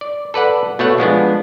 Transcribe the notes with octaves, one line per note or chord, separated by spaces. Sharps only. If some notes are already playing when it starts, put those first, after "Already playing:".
D5
A4 B4 D5 F#5
B2 A3 C#5 F#5
F3 G#3 B3 D4